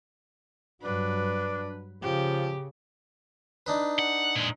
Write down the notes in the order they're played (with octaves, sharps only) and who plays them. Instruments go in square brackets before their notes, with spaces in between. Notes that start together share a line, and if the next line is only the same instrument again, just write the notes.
[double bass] G2 F#3 [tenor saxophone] D4 [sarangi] B4
[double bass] C#3 [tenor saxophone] F3 [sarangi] G4
[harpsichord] D4 D#4 B4
[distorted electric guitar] F#5
A#2 G#3